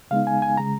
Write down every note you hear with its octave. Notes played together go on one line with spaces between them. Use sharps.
C#3 G#3 B3 D#4 F5
G#5
G#5
C#3 G#3 A#5